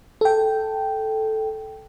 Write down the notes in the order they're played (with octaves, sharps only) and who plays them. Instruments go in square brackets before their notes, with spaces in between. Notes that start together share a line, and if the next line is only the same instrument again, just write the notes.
[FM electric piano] A4 G5